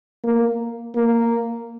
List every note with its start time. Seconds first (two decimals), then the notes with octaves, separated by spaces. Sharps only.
0.24 A#3
0.95 A#3